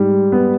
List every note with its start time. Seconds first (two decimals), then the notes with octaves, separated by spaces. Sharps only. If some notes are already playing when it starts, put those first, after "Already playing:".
Already playing: G#2 G3
0.32 B3